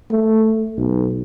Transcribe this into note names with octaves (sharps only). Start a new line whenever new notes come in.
A3
B1